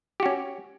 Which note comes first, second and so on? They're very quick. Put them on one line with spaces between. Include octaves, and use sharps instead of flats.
G4 F#4 C#4